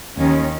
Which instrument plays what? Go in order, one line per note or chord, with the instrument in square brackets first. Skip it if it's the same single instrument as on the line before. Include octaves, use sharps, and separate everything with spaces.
[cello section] D#2 D#3 C#4